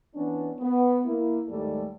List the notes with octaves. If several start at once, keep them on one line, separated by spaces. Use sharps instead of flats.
E3 B3 C#4 D4
B3
A#3 E4
D#2 G#2 G3 A3 A4 D5